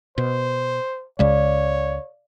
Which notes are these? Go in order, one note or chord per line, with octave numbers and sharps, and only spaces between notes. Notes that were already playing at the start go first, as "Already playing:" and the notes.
B2 C5
C#2 C#3 G#3 C#5 D5 F5